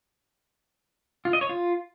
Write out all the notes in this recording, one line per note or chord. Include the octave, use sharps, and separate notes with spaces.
F4
D#5
C#5
F4